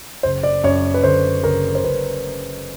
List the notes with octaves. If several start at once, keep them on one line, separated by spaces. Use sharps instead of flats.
F#1 C5
D5
F#2 C#5
B4
D3 C5
F#1 A#4
C5
F#1 B4